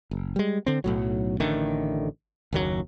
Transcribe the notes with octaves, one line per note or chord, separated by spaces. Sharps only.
F#1
G3 G#3
D3 C4
B1 A2 F#3
A1 D3 D#3 A3
F#1 D#2 F#3